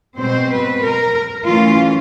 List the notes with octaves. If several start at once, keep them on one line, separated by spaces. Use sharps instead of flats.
B2 G#3 C4 C5
B4
A#4
E3 A3 C#4 F4